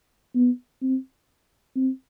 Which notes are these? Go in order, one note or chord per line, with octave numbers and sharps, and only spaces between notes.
B3
C4
C4